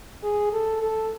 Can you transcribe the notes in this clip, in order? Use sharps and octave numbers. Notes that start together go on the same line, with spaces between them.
G#4
A4
A4